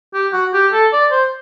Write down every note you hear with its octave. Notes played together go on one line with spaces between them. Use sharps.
G4
F#4
G4
A4
D5
C5